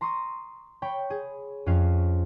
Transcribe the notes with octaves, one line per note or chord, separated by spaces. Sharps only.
A#5 C6 C#6 D#6 A#6
C#5 G5 B5
G#4
F2 C#4 F5 C7